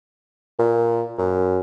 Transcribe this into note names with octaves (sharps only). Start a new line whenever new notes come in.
A#2
F#2